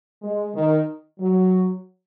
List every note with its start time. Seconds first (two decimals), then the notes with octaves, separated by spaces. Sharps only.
0.22 G#3
0.55 D#3
1.19 F#3